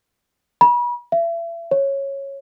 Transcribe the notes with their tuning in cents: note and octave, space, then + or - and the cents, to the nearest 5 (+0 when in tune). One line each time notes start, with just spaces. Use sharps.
B5 -35
E5 +35
C#5 -10